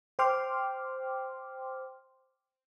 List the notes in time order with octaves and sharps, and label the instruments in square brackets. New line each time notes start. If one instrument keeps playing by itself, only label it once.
[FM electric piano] C5 G5 C6 D6 F6